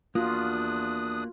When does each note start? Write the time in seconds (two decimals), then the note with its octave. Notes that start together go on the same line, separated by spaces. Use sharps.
0.15 E2 A#3 D4 F4 F#4 D#6 F#6